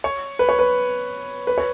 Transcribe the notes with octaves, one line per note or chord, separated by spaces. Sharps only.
C#5
B4
C#5
B4
B4
C#5